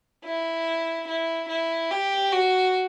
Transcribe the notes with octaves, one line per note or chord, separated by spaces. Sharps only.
E4
E4
E4
G4
F#4